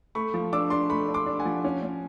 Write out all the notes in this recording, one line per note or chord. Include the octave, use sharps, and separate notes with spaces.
A3 B5 C#6
F3
D4 D6 E6
D4 C6 D6
A3 B5 C#6
D4
C6 D6
D4
F#5 G#5
F3
C#4
C#4